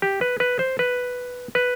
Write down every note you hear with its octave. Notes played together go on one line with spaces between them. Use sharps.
G4
B4
B4
C5
B4
B4